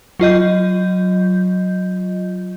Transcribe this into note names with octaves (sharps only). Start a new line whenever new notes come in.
F#3 F4 D#5 G6